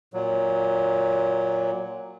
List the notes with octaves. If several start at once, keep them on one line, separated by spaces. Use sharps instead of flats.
A#2 F#3